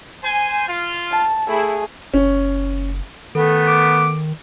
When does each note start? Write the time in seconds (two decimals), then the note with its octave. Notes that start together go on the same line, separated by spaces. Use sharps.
0.23 C5 G#5
0.69 F4
1.11 A5
1.48 A3 E4 G#4
2.13 F#1 C#4
3.35 D#3 A3 B3 A4
3.67 D6